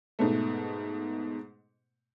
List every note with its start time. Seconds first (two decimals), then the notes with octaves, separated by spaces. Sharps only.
0.19 G#2 B2 A3